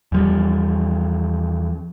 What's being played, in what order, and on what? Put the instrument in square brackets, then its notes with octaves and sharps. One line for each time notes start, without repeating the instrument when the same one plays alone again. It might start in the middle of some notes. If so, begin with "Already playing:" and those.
[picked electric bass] E2 F3 G3